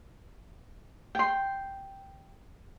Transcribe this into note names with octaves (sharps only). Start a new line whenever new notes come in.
G5 C6